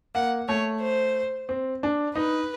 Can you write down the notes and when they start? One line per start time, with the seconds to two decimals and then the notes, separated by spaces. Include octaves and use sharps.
0.15 A#3 F#5
0.49 A3 C#5
0.82 C5
1.49 C4
1.83 D4
2.16 D#4 B4